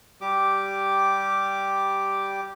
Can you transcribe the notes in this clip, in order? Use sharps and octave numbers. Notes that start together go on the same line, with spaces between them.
G3 G4 D6